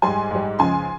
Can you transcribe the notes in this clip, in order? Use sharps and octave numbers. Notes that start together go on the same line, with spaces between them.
G#2 G3 G#5 C6
G#2 G3
C#2 C#3 F3 G#5 C6